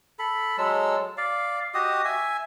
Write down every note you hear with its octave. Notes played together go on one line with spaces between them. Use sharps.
A4 B5
F#3 G#3 A4 E6
D5 F5
F#4 G4 D#5 D#6
E5 G#5